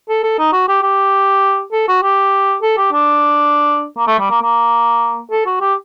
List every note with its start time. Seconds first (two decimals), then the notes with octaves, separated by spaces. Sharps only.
0.09 A4
0.23 A4
0.38 D#4
0.53 F#4
0.68 G4
0.82 G4
1.72 A4
1.88 F#4
2.03 G4
2.62 A4
2.77 G4
2.92 D4
3.97 A#3
4.07 A3
4.19 G3
4.30 A#3
4.41 A#3
5.31 A4
5.46 F#4
5.61 G4